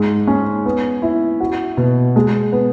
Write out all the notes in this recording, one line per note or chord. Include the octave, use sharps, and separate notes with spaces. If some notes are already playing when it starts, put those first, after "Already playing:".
Already playing: G#2 G#3
C#4
B3
E4
F#4
B2
G#3
B3